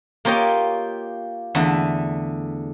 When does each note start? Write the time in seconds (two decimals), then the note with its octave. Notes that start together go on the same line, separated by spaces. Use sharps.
0.25 A#3 F4 G4 C#5 D#5 G5
1.55 E2 D3 A3